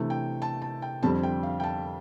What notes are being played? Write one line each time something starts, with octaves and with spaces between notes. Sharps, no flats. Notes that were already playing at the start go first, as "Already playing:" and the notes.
Already playing: C3 E3 A3 D4
G5
A5
A5
G5
F2 D3 G3 C4 A5
G5
F5
G5
A5